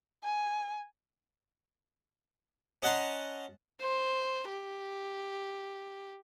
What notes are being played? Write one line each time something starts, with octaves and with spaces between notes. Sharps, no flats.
G#5
C#4 D#5 F#5 A5 A#5 C6
C5
G4